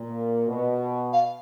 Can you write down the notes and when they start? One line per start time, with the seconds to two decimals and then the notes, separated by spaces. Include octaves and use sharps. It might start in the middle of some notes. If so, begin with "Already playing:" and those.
Already playing: A#2
0.48 B2
1.13 F5